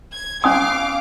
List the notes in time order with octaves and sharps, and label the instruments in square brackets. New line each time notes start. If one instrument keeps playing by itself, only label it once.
[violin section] G#6
[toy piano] C#4 G#5 D#6 [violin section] F5 D6